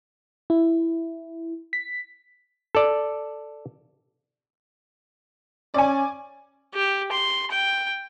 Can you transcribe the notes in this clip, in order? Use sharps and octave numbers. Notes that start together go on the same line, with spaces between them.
E4
B6
A4 D5
C#4 D5 G#5
G4
C6
G5